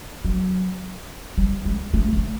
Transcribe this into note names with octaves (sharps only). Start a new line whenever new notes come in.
F#3
G3
G#3
A3
A3